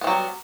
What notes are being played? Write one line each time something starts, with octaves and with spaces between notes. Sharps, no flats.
E3 F#3 G3 B3